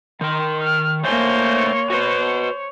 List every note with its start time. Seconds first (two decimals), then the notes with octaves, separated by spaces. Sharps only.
0.21 D#3 A#4 C6
0.62 F6
1.04 A3 A#3 C5 C#5 G#5 C6
1.90 F#4 B4 C5